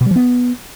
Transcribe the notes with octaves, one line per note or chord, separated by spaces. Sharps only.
B2
G3
F3
B3